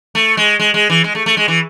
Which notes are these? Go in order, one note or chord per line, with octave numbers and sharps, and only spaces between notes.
A3
G#3
G#3
G#3
E3
G#3
A3
A3
G#3
E3